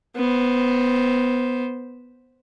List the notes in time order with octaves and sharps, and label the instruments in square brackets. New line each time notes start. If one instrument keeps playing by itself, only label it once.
[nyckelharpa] B3 C5